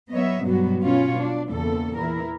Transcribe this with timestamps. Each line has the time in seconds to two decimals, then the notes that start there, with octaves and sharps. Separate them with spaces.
0.11 F#3 B3 C#5 D#5 E5
0.46 G2 B2 F#3 B3 F#4
0.82 B2 C#4 F4 C#5
1.18 D4
1.49 E2 A#2 C#3 A4
1.96 E3 E4 A#4